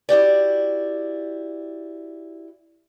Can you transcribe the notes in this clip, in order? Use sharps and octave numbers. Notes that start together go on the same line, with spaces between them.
E4 F#4 G4 D5